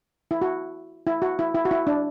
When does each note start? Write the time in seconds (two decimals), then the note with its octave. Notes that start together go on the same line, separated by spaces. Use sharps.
0.31 E4
0.42 F#4
1.07 E4
1.22 F#4
1.39 E4
1.55 E4
1.65 F#4
1.71 E4
1.87 D4